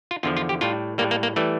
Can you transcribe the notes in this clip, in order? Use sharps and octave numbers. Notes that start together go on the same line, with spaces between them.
F4
E2 D3 F3 F4
F4
G4
A2 G3 F4
A2 G3 A#3
A#3
A#3
E3 G3 A3